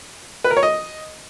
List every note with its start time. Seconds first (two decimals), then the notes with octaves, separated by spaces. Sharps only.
0.44 B4
0.51 A#4
0.57 C#5
0.63 D#5